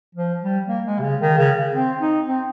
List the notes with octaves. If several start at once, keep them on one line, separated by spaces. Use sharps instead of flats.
F3
G3
A#3
G#3
C3
C#3
D#3
C#3
C4
D#4
C4